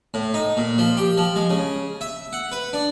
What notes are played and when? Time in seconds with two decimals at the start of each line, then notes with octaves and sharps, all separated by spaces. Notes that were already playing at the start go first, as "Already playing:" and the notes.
0.14 A2
0.34 D#4
0.57 A#2
0.78 F3
0.97 G4
1.18 F3
1.36 G#3
1.50 C#3
2.01 E5
2.33 F#5
2.52 B4
2.73 D4